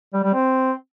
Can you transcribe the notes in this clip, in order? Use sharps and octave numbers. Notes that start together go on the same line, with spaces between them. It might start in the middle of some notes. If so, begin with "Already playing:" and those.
G3
G3
C4